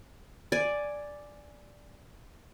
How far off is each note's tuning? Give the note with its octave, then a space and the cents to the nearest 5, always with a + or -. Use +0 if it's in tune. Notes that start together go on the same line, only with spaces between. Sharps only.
D5 +0 G#5 +0